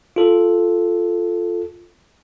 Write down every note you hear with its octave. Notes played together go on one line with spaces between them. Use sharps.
F4 A4